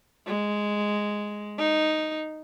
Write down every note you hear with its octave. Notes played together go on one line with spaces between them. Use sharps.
G#3
D#4